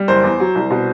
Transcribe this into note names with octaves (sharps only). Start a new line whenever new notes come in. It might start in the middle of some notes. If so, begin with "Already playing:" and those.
Already playing: G3
F#1 C5
E2
F#3
C2
B2